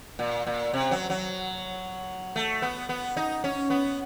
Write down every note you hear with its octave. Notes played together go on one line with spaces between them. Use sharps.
A#2
A#2
C3
F#3
F#3
A3
B3
B3
D#4
C#4
B3